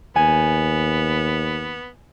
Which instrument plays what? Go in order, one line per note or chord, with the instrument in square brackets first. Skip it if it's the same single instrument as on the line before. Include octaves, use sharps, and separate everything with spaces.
[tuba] D#2 [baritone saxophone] B3 [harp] G#5